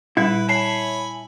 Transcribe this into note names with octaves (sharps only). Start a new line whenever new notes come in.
A#2 G3 E4 B4
C#5 G#5 A5 B5 C7